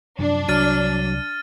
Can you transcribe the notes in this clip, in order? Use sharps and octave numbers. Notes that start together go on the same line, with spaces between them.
F#2 C3 F3 D4
C2 F#3 F6 A6 D#7